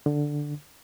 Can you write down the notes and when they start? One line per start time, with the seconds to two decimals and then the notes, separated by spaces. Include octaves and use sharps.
0.06 D3